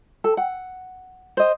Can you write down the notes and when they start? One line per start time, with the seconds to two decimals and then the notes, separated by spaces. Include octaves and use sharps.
0.24 A4
0.37 F#5
1.37 C5 D#5